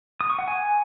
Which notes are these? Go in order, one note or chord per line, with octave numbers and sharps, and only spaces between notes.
D#6
C#6
F#5
G#5